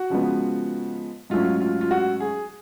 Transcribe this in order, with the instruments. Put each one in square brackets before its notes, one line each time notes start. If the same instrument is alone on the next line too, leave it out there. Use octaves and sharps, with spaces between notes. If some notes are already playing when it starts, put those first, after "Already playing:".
Already playing: [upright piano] F#4
C#3 F3 G#3 B3
G#2 F#3 A3 C#4 F4
F4
F4
F#4
G#4